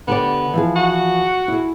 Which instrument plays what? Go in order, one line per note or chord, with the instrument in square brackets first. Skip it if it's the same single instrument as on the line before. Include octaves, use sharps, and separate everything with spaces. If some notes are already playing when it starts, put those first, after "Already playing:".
[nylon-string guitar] D3 G4 D5 [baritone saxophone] B3
[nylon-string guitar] E3 F3 G#4
[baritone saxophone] F#4
[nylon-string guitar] E4 G#4